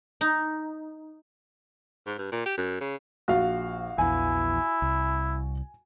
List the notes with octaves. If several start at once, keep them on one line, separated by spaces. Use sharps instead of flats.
D#4
G#2
G2
A#2
G4
F#2
C#3
A#1 F#4 F5
A#1 E2 E3 E4 G#5
C2